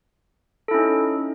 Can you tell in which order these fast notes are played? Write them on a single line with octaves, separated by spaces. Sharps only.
A4 E4 C#4 D#4